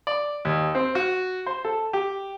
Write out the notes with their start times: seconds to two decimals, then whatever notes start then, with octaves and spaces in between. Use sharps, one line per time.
0.07 D5
0.45 D#2
0.75 C4
0.95 F#4
1.46 C5
1.65 A4
1.93 G4